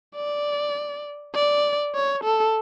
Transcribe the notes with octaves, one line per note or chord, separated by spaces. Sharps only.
D5
D5
C#5
A4